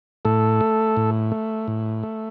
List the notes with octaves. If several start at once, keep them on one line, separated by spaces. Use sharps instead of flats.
A2 A4
A3
A2
A3
A2
A3